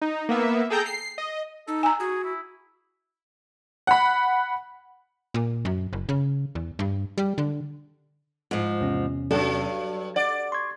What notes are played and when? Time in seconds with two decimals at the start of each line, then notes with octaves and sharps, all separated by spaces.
0.02 D#4
0.29 A#3 B3 E5
0.70 G#4 A4 G5 A#5 G6
0.86 C7
1.18 D#5
1.67 D#4 A4
1.83 G#5 A#5 E6
2.00 F#4 G#4
2.24 E4
3.87 F#5 B5
5.34 A#2
5.65 F#2
5.93 F#1
6.09 C#3
6.55 E2
6.79 G2
7.18 G3
7.38 D3
8.51 G#2 F3
8.80 E2 C3 C#4
9.31 G2 F#3 A4
10.16 D5 F#5
10.52 C6 C#6 G#6